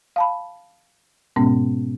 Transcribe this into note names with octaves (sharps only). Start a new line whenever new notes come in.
F5 A5 B5
G#2 B2 G#3 B3 C#4